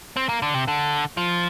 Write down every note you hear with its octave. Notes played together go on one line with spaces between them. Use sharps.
C4
A#3
D3
C3
D3
F3